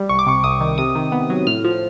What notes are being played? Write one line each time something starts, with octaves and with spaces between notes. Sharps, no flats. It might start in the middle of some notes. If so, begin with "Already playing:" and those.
Already playing: G3
C2 C#6
D6
C3 C#6
C2 D#6
D#3
C3 D#6
D#3
B3
F#3
A2 F6
F3